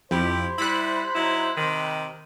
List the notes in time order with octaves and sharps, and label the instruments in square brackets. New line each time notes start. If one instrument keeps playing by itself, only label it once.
[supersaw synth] F2 [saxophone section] E4 G4 [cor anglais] C5
[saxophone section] G3 E4 [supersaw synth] B5 F#6
[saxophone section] F#3 D#4 E4
C3 D#3